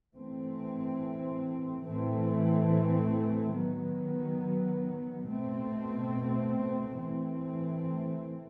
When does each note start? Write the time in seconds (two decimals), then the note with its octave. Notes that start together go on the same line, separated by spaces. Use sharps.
0.13 E3 A3 C4
1.84 A2 E3 A3 C4
3.55 D#3 F#3 B3
5.27 B2 A3 C4
6.98 E3 A3 C4